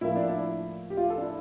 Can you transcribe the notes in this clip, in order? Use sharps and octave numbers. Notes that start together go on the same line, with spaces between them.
A2 F3 A#3 E4
D4
E4
G4
F4
A4
D4
E4